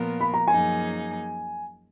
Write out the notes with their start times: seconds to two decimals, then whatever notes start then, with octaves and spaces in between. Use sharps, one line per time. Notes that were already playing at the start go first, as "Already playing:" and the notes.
Already playing: A#2 F3 B3 F4 A#4
0.21 B5
0.34 A#5
0.48 F#2 F3 A#3 D#4 G#4 G#5